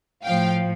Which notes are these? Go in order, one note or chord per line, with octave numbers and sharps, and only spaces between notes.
A2 F3 F5 G5